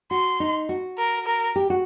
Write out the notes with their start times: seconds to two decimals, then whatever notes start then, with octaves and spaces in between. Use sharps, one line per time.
0.11 F#4 C6
0.40 D#4
0.69 F#4
0.98 A#4
1.26 A#4
1.56 G4
1.70 F#4